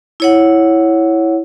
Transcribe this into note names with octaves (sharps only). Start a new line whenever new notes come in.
E4 C#5 F#5